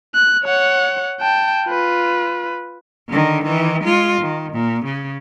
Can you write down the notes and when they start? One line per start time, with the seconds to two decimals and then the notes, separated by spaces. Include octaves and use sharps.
0.15 F#6
0.44 C#5 F#5
1.21 G5 A5
1.65 F4 B4
3.09 D3 D#3
3.45 D#3 E3
3.83 G#3 F4
4.21 D#3
4.52 A#2
4.85 C#3